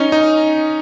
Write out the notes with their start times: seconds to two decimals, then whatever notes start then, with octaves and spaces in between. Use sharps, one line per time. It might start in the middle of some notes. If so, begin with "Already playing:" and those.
Already playing: C#4 D#4
0.12 D#4